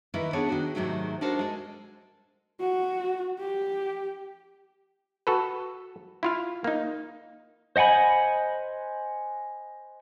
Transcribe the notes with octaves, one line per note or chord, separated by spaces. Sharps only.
D#3 E3 E4 A#4 B4
B3 D4 G#4 A4 C#5
D#3 D4 F#4
G#2 C3 D#3 F#3 G#3 A3
D4 D#4 F#4 A4 A#4 C5
G#3 A4
F#4
G4
F#4 A4 B4
E4 F4 F5
A#3 D#4
C5 D#5 F#5 G#5 B5